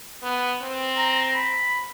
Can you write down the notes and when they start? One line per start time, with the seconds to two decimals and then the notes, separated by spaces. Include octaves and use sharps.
0.23 B3
0.62 C4
0.97 A#5
1.34 B5